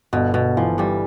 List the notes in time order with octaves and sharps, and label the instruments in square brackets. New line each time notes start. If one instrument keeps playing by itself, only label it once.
[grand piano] G1 [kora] B2
[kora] B2
[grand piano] E3 [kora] F3
[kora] G2 G3